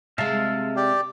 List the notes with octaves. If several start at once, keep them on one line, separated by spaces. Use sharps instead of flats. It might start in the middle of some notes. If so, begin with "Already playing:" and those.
C3 G#3 E5 F5 A5
G4 D5 G5